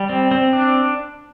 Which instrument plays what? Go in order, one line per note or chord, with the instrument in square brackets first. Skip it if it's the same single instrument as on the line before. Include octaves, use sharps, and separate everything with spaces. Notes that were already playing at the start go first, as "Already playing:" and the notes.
Already playing: [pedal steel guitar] G3
C4
C4
D4